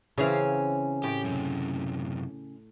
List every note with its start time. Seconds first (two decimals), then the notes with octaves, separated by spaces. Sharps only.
0.18 C#3 E3 C4 C#4 G#4 F5
1.04 A2 G4 G5
1.24 F#2 C3